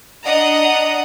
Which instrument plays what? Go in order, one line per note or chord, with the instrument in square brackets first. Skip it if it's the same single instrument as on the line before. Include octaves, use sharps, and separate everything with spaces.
[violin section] D4 D#5 F#5 A#5 D#6